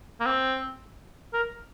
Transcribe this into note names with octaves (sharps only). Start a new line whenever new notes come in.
A#3
C4
A#4